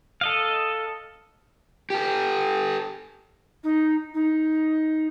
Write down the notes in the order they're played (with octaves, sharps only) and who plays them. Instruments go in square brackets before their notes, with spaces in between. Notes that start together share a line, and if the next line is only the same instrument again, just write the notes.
[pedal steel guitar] A4 D#5 F5
[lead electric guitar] G4 A4
[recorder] D#4
D#4